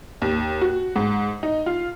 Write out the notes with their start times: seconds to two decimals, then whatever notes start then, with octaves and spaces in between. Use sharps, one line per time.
0.22 D#2
0.61 F#4
0.96 G#2
1.43 D#4
1.66 F4